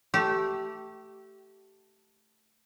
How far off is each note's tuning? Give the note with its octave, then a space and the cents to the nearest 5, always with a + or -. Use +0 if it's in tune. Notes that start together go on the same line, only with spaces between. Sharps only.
A3 +0 G4 -25